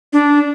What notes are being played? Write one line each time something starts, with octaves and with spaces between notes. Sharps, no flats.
D4